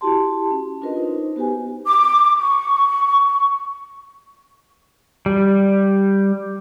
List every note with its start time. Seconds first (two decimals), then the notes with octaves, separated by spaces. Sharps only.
0.01 E4 F#4 G4 A5 C6
0.51 C#4
0.81 D4 F4 F#4 A#4 B4 D#5
0.96 D#4 C5
1.36 B3 F#4 G4 B4 G#5
1.86 D6
2.39 C#6
5.26 G3